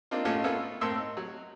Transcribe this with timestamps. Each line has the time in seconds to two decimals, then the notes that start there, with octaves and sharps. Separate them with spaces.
0.11 A#3 C4 D4 D#4 F4
0.25 A2 A3 C#4 D#4 F4 F#4
0.44 A#3 B3 C#4 F4 A4 E5
0.81 A2 A#3 C4 E5 C6 E6
0.98 D#4
1.17 F#3